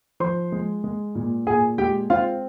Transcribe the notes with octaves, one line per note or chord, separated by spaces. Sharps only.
F3 C5 C6
G#3
G#3
A#2
A#2 G#4 G#5
G#3 G4 G5
C4 F4 F5